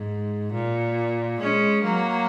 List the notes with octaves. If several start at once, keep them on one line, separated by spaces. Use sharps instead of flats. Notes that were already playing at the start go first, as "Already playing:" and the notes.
Already playing: G#2
A#2
G#3 C#4
F#3 A#3